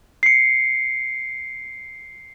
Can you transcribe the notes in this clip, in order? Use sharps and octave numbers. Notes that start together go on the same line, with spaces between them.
C7 C#7